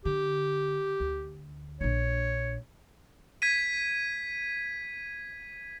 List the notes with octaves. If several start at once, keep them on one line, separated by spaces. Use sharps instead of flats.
D3 G4
D2
A#1 D4 C#5
G#6 B6 D#7